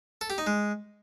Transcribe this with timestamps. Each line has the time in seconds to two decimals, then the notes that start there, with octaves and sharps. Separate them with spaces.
0.21 A4
0.30 G4
0.38 D#4
0.47 G#3